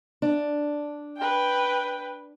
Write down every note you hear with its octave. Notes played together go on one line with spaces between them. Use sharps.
D4
B4 G5